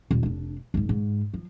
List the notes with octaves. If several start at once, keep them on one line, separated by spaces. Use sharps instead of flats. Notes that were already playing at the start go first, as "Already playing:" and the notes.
D#1 F4
F1 D4
G#1 G#2
G#2
F3